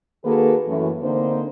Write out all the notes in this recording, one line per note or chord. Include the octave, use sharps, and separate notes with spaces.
D#3 A#3 F#4 G#4 A4 B4
F#2 A2 E3
D3 A#3 C4 D#4 C5